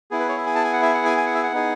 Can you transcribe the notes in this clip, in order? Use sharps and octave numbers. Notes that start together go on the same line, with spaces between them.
B3 E4 G#4
B4
C#5
E5
G#5
A5
G#5
F#5
E5
F#5
G#5
G#5
F#5
E5
F#5
B3 D#4 G#4